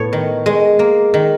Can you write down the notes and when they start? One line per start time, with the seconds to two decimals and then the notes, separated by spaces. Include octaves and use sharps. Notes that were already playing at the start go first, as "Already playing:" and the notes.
Already playing: A2 B3 C#5
0.13 D#3
0.46 G#3
0.79 A#3
1.14 D#3